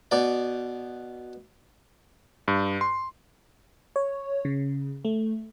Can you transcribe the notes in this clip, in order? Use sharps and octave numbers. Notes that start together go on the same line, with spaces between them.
B2 D5
G2
C6
C#5
C#3
A3